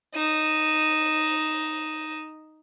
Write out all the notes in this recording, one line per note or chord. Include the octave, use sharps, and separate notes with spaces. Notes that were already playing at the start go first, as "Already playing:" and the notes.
D#4 E7